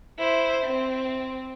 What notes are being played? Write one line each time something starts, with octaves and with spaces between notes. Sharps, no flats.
E4 C5
C4